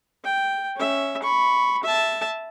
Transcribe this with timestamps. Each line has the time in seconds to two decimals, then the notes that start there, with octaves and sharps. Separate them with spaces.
0.24 G5
0.76 C#4 E5
1.22 B5 C#6
1.83 E5 A5